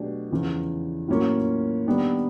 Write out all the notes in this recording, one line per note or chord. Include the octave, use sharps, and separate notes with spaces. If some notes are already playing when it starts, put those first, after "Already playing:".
Already playing: B2 F#3 A3 D4 G4
E2 C#3 F3
A2 F#3 A#3 C#4 F4
D#3 G3 B3 D4